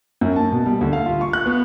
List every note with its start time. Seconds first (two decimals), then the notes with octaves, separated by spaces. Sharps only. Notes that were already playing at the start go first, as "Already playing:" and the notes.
0.21 F#2
0.36 A5
0.52 B2
0.66 G3
0.81 D2
0.93 F5
1.06 F4
1.21 C#6
1.33 F#6
1.46 B3